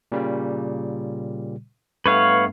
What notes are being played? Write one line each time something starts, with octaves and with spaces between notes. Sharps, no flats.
A#2 C#3 G3
G2 A3 B3 B4 C#5 F5